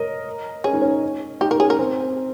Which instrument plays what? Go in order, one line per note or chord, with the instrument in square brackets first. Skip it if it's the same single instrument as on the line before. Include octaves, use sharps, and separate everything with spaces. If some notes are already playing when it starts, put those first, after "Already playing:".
Already playing: [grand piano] A#4 C#5 D#5
[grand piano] C#4 [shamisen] G#4
[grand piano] D#4
C#4
[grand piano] D#4 [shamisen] G4
[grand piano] D#4 [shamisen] A#4
[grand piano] C#4 [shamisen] G#4
[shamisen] A#4
[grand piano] C4